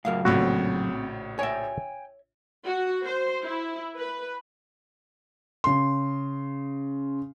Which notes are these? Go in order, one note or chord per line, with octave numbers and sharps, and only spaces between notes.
C#2 F#2 A2 A#4 F5
A#1 A2 C#3 C4 F#4
C#5 E5 G5 G#5
F#4
C5
E4
B4
C#3 C6